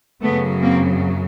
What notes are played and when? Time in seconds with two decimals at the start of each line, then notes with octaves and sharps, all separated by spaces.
0.22 F#2 C#3 F#3 A3 B3
0.61 A#3 C4